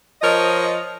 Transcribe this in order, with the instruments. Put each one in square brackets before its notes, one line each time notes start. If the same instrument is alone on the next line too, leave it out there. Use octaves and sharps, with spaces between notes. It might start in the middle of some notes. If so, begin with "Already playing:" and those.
[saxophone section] F3 A#4 C#5 D#5